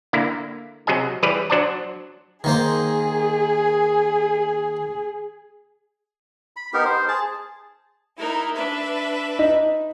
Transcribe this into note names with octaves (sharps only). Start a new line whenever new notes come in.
D3 A#3 E4
C3 F#3 G#4 D#5 G#5
E3 G3 G#4 B4 C#5 D5
F#3 D4 C5 D5 A5
D#3 A#3 G#4 C5
B5
B3 D#4 G4 A#4
C5
G#4 A5
D#4 E4 A#4
D4 B4 E5
D#4